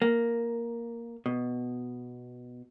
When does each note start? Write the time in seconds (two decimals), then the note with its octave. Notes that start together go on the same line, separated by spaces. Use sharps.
0.02 A#3
1.26 B2